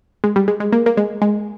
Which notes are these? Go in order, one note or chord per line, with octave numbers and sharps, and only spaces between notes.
G#3
G3
G#3
G#3
A#3
A#3
G#3
G#3